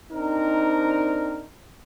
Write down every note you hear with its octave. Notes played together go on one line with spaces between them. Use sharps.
C4 D4 D#4 A#4